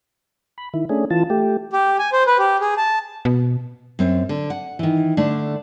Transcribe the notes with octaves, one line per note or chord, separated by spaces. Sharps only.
B5
D#3 E4
A3 C#4 D4 G#4
E3 F4 A5
A3 G4
G4
G#5
C5
B4
G4
G#4
A5
B2
F#2 C4
D3
F#5
D#3 E3
D3 A3 D4